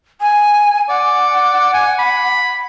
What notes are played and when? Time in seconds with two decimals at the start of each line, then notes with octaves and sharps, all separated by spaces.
0.21 G#5
0.89 D5 F#5
1.74 G#5
1.99 B5